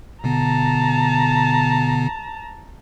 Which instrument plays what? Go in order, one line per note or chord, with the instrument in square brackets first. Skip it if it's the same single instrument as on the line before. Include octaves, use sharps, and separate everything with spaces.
[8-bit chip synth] B2 D3 B3 [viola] A5 A#5